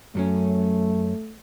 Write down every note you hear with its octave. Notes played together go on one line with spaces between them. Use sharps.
F#2 F#3 A3 C#4